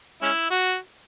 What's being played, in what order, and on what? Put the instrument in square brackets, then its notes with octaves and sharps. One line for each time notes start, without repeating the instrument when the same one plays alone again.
[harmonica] G#3 C#4 E4
F#4